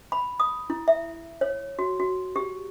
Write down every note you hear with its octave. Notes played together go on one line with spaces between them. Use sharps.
B5
D#6
E4
E5
C#5
F#4
F#4
G4